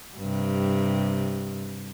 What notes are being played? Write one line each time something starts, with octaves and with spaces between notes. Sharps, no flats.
G2 C3